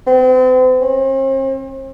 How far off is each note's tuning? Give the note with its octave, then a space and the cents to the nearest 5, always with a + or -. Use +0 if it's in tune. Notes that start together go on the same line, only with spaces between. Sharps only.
C4 -40
C4 +45